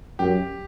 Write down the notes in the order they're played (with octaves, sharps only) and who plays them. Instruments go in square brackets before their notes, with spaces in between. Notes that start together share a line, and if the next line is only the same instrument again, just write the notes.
[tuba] F#2 [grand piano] G4